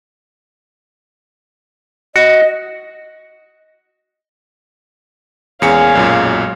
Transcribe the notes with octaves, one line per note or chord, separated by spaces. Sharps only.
F#4 D#5
E2 G#3 A#3 C#4 C#5 F5 C#7
B1 F#2 A#2